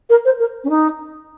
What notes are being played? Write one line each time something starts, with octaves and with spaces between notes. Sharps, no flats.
A#4
C5
A#4
C#4
D#4